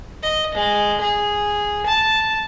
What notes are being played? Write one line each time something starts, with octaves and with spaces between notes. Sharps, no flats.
D#5
G#3
G#4
A5